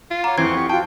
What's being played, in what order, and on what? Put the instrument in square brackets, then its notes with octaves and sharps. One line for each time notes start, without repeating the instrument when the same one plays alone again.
[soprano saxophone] F4
[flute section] C#5 F#5 D6 [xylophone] A#5
[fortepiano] F2 E3 [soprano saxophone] C4 [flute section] F#5 C#6 [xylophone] G#6
[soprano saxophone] G4
[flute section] F4 F#4 [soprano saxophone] G5 [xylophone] A5